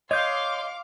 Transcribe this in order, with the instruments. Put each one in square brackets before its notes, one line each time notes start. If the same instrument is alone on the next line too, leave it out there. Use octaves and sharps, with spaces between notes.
[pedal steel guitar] C#5 G6 [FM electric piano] D#5 [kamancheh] F5 D6 [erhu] C6